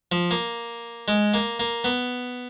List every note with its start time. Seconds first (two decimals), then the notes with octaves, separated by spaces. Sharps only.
0.12 F3
0.31 A#3
1.08 G#3
1.34 A#3
1.60 A#3
1.84 B3